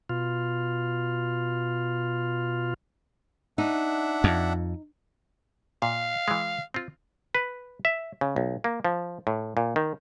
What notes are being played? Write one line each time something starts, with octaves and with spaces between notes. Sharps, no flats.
B2 F4
D4 D#4 E5 F#5
F2
A#2 F5
E3 G#3
C4 F4
B4
E5
C#3
B1
A#3
F3
A2
A#2
D#3